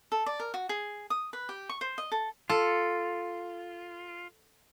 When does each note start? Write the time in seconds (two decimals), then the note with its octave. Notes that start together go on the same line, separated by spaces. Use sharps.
0.12 A4
0.26 D5
0.40 A#4
0.54 F#4
0.69 G#4
1.10 D#6
1.33 B4
1.49 G4
1.69 C#6
1.81 C5
1.98 D#5
2.12 A4
2.50 F4 A4